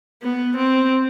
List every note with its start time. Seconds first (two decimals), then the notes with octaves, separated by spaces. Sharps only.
0.23 B3
0.57 C4